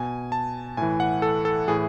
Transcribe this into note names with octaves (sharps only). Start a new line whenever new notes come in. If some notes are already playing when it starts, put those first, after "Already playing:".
Already playing: B2 G#5
A5
A2 E3 G#5
F#5
A4
A4
A2 E3 G#4